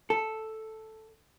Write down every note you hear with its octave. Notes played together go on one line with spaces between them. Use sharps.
A4